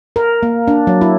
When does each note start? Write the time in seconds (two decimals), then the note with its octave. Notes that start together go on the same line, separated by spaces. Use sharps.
0.16 A#4
0.43 A#3
0.68 D4
0.87 F#3
1.01 E4